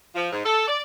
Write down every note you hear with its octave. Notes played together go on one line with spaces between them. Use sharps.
F3
G#2
A4
D5